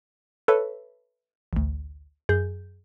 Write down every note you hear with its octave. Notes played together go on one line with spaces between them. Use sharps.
A4 B4 C#5 E5
A1 D2
F#2 G#4 G6